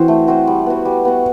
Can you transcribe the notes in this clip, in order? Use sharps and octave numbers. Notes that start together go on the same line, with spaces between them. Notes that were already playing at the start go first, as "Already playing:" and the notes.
Already playing: E3 C4 F#4 C5
A3
C4 F#4 C5
G3
B3 F#4
G3
B3 F#4